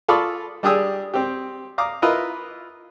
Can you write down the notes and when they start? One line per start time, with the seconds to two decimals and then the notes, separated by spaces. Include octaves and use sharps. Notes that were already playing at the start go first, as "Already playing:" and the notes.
0.08 F4 A4 D5 B5 C#6 D#6
0.63 G3 D4 G4 G#4 D#6 E6
1.14 C4 G4
1.78 F5 A#5 D6 D#6
2.02 E4 F4 A#4 B4 D#5 E5